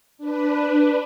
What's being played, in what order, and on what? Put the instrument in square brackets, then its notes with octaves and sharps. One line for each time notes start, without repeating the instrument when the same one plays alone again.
[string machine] D4 B4